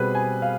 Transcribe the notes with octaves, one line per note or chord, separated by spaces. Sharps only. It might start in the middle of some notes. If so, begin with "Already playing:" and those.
Already playing: B2 G3 C4 G#4 B4
G#5
F5